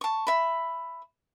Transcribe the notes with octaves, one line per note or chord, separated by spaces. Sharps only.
A5 C#6
E5 B5